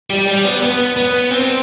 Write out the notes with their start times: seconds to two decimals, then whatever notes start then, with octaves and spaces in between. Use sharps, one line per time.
0.10 G3
0.27 G3
0.45 B3
0.62 B3
0.97 B3
1.31 C4